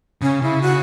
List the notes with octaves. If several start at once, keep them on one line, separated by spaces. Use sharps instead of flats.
C#3 C#4
C#3 E4
F#4